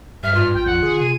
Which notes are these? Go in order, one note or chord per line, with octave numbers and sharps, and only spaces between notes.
G2 E5 F6
G#2 F4
A1 G5
F2 F#5
D3 G#4
C3 D#7